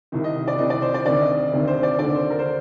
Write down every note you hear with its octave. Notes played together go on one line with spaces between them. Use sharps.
C2 C3 D#3
D#5
D5
C2 C3 D#3 D#5
D5
C5
D5
D2 C3 D#3 D5
D#5
D2 C3 D#3
C5
D5
D#2 D3 D5
C5
A#4
C5